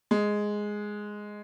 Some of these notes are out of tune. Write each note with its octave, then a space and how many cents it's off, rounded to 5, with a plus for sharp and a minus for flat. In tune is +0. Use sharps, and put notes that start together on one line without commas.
G#3 +0